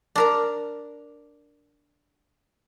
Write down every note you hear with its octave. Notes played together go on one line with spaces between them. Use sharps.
D4 A#4 A#5